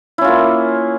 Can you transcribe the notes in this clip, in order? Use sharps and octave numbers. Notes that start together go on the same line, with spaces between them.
A#3 C#4 E4 F4